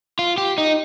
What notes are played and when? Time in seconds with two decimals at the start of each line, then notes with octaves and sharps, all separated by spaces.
0.19 F4
0.38 G4
0.58 D#4